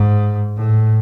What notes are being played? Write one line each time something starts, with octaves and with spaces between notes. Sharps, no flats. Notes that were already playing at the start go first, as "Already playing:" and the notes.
Already playing: G#2
A2